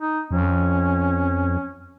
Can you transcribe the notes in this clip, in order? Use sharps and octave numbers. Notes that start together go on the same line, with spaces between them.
D#4
F2 C#4